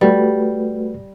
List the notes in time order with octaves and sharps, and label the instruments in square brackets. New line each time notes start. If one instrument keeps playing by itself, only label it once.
[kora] G3 [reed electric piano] A3 F#4 B4